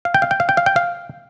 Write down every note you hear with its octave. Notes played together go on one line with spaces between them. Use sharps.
F5
G5
F5
G5
F5
G5
F5
G5
F5